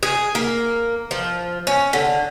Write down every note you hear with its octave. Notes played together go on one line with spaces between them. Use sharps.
G#4
A#3
F3
C#4
D3